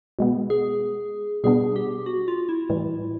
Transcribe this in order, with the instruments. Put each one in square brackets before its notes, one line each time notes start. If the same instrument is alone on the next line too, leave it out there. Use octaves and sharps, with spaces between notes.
[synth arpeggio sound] B2 G#3 B3
[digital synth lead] G#4
[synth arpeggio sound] B2 G3 B3 D4 [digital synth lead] G#4
[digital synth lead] G4
F#4
F4
E4
[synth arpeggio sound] A2 E3 G3